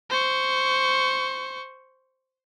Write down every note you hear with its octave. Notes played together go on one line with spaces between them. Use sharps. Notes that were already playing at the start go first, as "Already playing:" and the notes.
C5 C#6